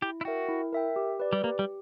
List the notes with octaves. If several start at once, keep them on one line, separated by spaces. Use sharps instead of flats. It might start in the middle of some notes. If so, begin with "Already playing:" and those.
E4 G4
E4
F#4 A#4 E5 G5
E4
A#4 E5 G5
G4
B4 D5
G3
A#3 G4
G3